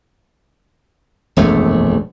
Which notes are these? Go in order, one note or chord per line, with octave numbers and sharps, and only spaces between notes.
E1 A#1 F#2 A3